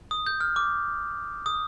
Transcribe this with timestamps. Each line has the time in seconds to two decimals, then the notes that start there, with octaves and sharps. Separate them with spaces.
0.11 D#6
0.26 G6
0.41 F6
0.56 D6
1.46 D#6